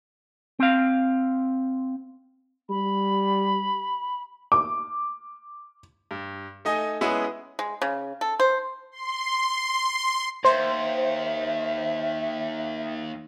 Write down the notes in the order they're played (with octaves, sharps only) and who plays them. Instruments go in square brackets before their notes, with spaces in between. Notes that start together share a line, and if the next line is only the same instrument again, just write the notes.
[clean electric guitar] C4 F5
[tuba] G3 [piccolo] B5
[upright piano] D6
[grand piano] G2
A3 D#4 D#5 G#5
G#3 B3 C#4 E4 G#4 F#5
[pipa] G#3
C#3
A4
C5
[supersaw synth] C6
[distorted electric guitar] D#2 [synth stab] C5 [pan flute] E5